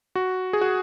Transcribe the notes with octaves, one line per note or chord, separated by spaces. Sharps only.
F#4
G#4
F#4